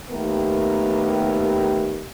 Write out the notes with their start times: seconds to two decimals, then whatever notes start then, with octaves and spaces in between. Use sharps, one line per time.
0.10 D#2 A3 B3 G4 A#4